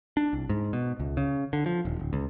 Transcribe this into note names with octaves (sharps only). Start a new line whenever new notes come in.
D4
C2
G#2
B2
C#2
C#3
D3
F3
D#1
D1
C#2